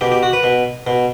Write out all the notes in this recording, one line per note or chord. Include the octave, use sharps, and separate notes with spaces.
B2 G4
G4
F#4
B4
B2
B2